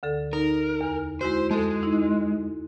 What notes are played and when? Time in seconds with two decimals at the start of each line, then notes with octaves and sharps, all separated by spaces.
0.03 D2 D3 A4
0.33 D#4 A#4
0.81 E2
1.21 G#3 E4 F#4 C5
1.51 F2 G#3 A4
1.83 D#4 E4